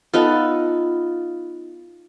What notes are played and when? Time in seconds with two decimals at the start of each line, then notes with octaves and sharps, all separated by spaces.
0.14 B3 D#4 F4 A4